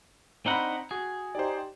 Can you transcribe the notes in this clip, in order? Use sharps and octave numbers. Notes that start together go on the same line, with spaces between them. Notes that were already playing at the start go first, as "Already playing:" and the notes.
C4 D4 D#4 F#5 A#5 B5
F#4 G#4
D#4 G4 C5 D5